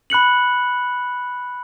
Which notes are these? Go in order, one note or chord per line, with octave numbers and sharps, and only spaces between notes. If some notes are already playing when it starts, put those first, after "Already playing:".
B5 F#6 C#7 F#7